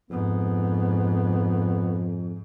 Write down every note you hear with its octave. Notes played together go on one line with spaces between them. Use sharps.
F2 G#2 B3